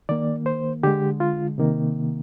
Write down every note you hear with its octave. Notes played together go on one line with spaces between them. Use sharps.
D#3 A#3 D5
C5
D3 G#3 G4
F4
C3 D#3 A#3